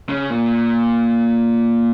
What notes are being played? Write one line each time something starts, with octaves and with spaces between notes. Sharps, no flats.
C#3
A#2